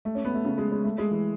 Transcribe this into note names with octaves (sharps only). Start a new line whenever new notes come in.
A3
C#4
B3
A3
C#3
G#3
G#3
A3
G#3
E3